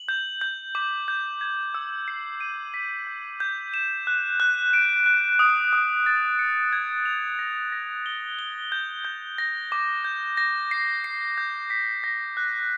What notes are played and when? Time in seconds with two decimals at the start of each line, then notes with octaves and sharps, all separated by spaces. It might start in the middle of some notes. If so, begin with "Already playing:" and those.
Already playing: F#7
0.09 G6
0.41 G6
0.75 D6
1.08 G6
1.41 G#6
1.74 E6
2.08 C7
2.41 D#7
2.74 B6
3.07 G6
3.40 G6
3.74 E7
4.07 F#6
4.40 F#6
4.73 D7
5.06 F#6
5.39 D#6
5.73 D#6
6.06 A6
6.39 C#7
6.73 G#6
7.05 F7
7.39 A#6
7.72 A#6
8.06 G7
8.39 G7
8.72 G6
9.05 G6
9.38 A#6
9.72 D6
10.04 G6
10.37 A#6
10.71 C7
11.04 C7
11.38 G6
11.70 B6
12.04 A#6
12.37 F#6